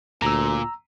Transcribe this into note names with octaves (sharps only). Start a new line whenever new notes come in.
D2 A#2 A#5 E6